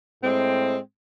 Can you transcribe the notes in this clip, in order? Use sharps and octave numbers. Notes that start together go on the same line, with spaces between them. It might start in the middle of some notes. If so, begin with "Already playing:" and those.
A2 G#3 C4